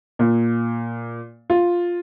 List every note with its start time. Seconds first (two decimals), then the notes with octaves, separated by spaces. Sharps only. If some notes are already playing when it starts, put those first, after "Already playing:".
0.19 A#2
1.50 F4